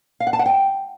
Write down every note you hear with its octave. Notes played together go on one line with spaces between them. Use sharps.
F5
F#5
A5
F#5
G5